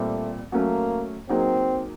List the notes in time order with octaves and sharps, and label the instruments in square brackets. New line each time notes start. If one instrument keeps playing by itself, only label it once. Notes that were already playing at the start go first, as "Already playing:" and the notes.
Already playing: [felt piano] A#2 G3 C4 [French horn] A3
[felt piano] F#3 A3 C#4 [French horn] A#3
[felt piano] F#3 A#3 D#4 G#4 [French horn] C4